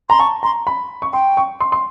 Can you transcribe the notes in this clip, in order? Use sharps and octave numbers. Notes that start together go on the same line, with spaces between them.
A#5 C6
A5 C#6
A#5 C6
B5
C#6
G5 C6
C#6
C6
C6